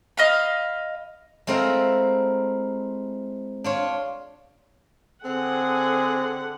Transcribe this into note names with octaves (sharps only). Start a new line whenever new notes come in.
D#5 F5 B5
G#3 A3 C4 E4 A#4 F5
D4 F4 C#5
D3 C4 G#4 F#5